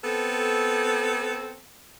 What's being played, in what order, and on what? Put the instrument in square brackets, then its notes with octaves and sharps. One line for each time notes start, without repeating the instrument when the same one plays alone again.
[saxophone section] B3 C4 A4